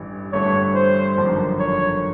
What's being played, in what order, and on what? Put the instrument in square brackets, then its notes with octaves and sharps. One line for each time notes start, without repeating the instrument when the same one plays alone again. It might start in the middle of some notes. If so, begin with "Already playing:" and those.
Already playing: [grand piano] A1 G2 E3
[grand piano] G1 G2 E3 A3 [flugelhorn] C#5
[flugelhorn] C5
[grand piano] G#1 F#2 D3 F3 A#3
[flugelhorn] C#5